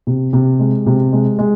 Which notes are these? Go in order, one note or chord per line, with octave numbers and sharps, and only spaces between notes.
C3
C3
G#3
C3
G#3
G#3